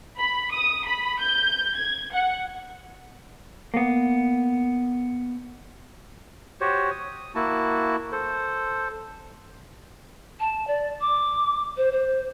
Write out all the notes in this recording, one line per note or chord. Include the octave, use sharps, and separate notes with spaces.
B5
D#6
B5
G6
G#6
F#5
A#3 B3
F#4 G4 C5 C#5
D#6
A#3 E4 F#4 A5
A4 C5
A5
D5
D6
C5
C5